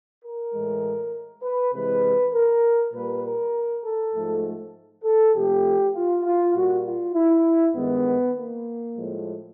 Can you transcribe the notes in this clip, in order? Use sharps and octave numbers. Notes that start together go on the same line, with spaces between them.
A#4
A2 E3 G#3
B4
C3 E3 G#3 B4
A#4
A#2 G3 A#3 B4
A#4
A4
G#2 F3 A3
A4
C3 F3 A3 G4
F4
F4
A#2 G3 A#3 F#4
F4
E4
G2 D#3 G#3 B3
A#3
A2 F3 G#3